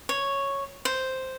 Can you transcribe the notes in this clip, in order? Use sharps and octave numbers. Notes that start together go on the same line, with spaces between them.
C#5
C5